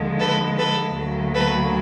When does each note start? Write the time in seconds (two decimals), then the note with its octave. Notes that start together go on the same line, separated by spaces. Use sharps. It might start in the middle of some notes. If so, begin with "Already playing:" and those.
Already playing: D#2 D3 F3 G#3
0.19 A4 B4
0.58 A4 B4
0.96 D2 D3 F#3 A#3
1.34 A4 B4